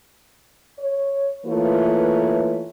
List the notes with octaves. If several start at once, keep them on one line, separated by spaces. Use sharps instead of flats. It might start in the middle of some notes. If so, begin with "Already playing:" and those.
C#5
E3 A3 A#3 F4 B4 C#5